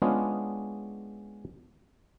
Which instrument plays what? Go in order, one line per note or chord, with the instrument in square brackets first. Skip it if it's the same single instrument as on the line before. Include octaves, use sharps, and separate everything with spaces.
[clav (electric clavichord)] G#3 B3 C#4 D4 F4 G#4